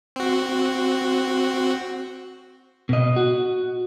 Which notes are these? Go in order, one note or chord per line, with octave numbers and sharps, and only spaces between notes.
C4 F#4
B2 D#5
F#4